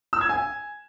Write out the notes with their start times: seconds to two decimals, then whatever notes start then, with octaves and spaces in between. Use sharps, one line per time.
0.13 E6
0.21 G#6
0.29 G#5